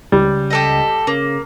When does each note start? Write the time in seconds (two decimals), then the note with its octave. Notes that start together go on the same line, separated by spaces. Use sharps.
0.12 C#2 G3
0.50 G4 A4 D#5
1.07 C#3 A#3